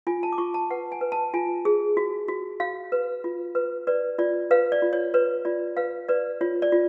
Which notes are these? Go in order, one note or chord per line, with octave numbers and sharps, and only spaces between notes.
F4 G#5
A5
D6
F4 C#6
A5
B4 F#5
G#5
B4
A5
F4 G#5
G#4
F#4
F#4
F#4 F5
B4
F4
B4
B4 D5
F4 D5
B4 F5
D5
F4
C#5
B4 C#5
F4 D5
B4 F5
B4 D5
F4 C#5
D5
F4